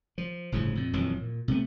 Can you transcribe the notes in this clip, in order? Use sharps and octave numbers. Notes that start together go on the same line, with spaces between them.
F3
G1 A2 C#3 F3
F2 A#2
D#1 F2 E3 F#3
A#2
C3 A3 B3